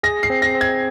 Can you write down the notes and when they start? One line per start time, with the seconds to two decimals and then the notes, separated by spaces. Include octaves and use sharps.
0.03 G#4 A#6
0.23 C7
0.30 C4
0.42 A#6
0.55 C4
0.61 G#6